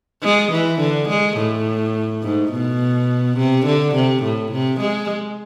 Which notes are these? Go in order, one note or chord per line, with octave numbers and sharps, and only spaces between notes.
G#3
E3
D3
G#3
A2
G#2
B2
C3
D3
C3
A2
C3
G#3